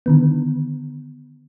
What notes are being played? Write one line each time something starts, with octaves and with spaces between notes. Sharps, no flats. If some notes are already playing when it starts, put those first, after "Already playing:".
D3 D#3 B3